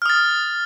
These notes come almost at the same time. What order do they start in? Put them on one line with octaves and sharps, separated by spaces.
F6 D#6 A6